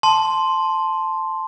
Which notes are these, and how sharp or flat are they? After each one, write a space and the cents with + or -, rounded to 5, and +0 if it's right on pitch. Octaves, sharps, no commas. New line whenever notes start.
A5 -5 C6 +0